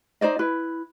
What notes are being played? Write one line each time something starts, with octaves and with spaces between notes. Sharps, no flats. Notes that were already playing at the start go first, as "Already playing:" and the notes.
D#4 C5 D5 D#5
E4 B4